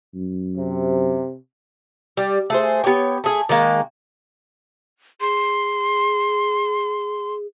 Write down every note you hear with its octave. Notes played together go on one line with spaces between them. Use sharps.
F#2
C3
G3
A3 G#4 C5
B3 G4 C#5 G5
A3 G#4
D#3 G#3 A#3
G#4 C6